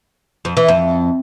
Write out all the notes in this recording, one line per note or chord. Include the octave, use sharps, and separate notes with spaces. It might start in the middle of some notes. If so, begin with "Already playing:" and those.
F2
E3
F2